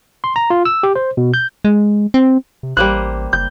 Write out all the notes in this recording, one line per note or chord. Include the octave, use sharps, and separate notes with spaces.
C6
A#5
F4
E6
G4
C5
B2
G6
G#3
C4
C3
A1 G3 A#3 C5 F#6
F#1 G6